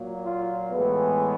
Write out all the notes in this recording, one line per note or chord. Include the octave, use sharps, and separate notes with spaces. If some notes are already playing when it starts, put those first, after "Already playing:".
Already playing: A#2 F#3 A#3
F4
A2 E3 G#3 B3